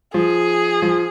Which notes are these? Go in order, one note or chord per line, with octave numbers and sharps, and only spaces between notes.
F3 G#4
F3